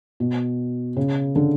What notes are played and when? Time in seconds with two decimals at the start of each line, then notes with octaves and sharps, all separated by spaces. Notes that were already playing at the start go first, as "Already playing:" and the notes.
0.20 B2
0.96 C#3
1.36 D3